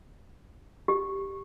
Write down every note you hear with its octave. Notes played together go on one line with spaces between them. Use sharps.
G4